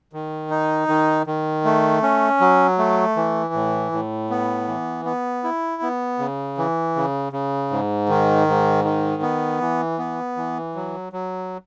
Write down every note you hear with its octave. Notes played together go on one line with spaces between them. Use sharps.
D#3
D#4
D#3
D#3
A3
C#4
F#3
A3
E3
A2
A2
B3
E3
B3
E4
B3
C#3
E3
C#3
C#3
G#2
D#3
G#2
D#3
B3
E3
B3
E3
F#3
F#3